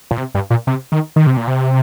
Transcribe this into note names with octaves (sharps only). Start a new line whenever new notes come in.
A#2
C3
G2
A#2
C3
D#3
D#3
C3
A#2
C3